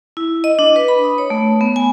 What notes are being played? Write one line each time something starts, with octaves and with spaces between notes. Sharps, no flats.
E4
D#5
D4
B4
B5
D#6
C#5
A3
B3
G#5